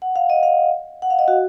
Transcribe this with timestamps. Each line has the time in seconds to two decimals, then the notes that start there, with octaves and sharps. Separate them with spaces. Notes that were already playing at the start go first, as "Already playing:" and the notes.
0.02 F#5
0.16 F5
0.30 D#5
0.43 F5
1.02 F#5
1.10 F5
1.19 D#5
1.28 F#4